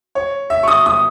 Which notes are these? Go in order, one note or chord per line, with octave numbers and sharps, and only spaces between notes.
C#5
E5
C#6
D#6
D#6